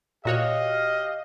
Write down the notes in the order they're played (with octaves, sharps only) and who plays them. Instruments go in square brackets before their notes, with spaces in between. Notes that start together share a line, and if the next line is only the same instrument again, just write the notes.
[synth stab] A#2 F#4 C#5 [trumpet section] G4 F5 [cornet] D#5